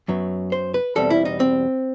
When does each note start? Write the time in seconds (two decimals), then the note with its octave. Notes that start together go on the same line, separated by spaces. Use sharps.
0.08 F#2 F#3 B3
0.52 C5
0.74 B4
0.96 E2 B2 G3 C4 A4
1.10 E4
1.25 D#4
1.40 C4